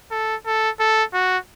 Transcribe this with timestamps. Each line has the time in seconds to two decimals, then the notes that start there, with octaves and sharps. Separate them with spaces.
0.11 A4
0.46 A4
0.80 A4
1.14 F#4